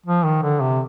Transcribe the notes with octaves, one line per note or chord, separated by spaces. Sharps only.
F3
D#3
D3
C3